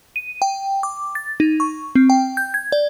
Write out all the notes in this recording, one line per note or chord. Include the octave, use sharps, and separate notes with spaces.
D#7
G5
D6
A6
D#4
C#6
C4
G5
G6
G#6
D5